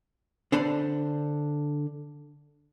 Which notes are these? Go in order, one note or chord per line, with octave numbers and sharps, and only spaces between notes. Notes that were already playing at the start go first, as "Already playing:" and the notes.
D3 D4 C5 A5 B5